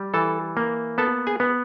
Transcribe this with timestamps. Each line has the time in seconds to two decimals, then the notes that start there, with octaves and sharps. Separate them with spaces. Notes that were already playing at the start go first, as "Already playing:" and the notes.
Already playing: G3
0.14 E3 A4 A5
0.57 A#3
0.98 B3 A4 A5
1.27 G#4 G#5
1.40 B3